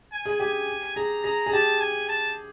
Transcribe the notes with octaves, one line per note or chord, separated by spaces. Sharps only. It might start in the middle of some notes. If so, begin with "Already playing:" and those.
G#5
G#4
G4 G#5
G#4 A#5
G#4 A#5
G#4
G4 A5
G#5
A5